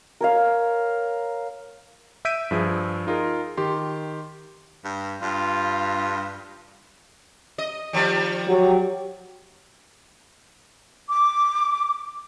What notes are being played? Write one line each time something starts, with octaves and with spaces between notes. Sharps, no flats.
A#4 C#5 F5
E5 E6 G6 B6 D7 D#7
G2 F3 G#4
D#4 F4 G#4 A#4
D#3 G4 C6
G2
G2 F4
D#5
D#3 F3 G3
F#3 G4
D6